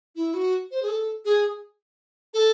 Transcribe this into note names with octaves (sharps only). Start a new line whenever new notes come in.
E4
F#4
C5
G#4
A4
G#4
A4